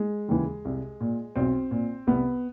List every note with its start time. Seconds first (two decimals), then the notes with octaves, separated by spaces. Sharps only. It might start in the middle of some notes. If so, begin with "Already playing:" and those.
Already playing: G#3
0.29 D#2 C#3 E3
0.65 C2
1.01 A#2
1.36 B1 C4
1.71 A#2
2.07 C2 B3